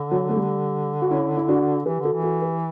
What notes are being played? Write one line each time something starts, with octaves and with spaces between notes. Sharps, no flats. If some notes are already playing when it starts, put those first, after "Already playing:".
Already playing: D3
F#3
A3
G3
F#4
C#4 E4
E4
D4 F#4
E3 G4 B4
D3 F#4 A4
E3
F#4 A4
G4 B4